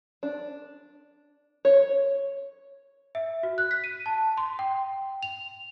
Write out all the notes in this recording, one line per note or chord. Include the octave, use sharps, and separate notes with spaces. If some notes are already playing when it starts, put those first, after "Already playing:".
D4
C#5
E5
F#4
F#6
B6
D#7
A5
C6
G5
F7